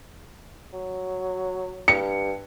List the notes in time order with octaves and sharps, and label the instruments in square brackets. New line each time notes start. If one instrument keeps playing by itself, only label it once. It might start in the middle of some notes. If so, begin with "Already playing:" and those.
[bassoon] F#3
[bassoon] G2 [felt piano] C#7